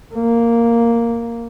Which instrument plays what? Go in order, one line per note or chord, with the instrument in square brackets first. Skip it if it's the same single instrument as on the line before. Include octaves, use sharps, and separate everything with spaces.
[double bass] A#3